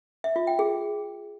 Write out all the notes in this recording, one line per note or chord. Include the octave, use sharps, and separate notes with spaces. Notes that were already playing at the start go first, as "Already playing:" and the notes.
E5
F4
G5
G#4